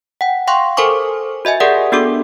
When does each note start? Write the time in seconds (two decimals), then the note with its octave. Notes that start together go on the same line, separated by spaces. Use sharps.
0.21 F#5 G5
0.47 F5 G5 C6 C#6 F#6
0.77 A4 A#4 C5 G#5 C#6 D6
1.45 F#4 D#5 E5 G#5
1.60 G4 G#4 A#4 D5 E5 F#5
1.92 B3 D4 F#4 G4 A4 D6